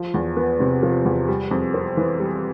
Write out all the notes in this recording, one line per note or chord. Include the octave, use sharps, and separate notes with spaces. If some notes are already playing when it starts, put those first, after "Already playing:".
Already playing: F3
E2
B3
C3
F3
E2
G3
F2
C4
E3
G3